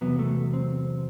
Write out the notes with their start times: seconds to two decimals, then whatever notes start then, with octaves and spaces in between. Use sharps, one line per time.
0.01 E2 C3 F#3 B3
0.19 A3
0.53 C4